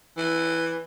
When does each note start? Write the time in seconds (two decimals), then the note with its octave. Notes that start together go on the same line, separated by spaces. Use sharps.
0.18 E3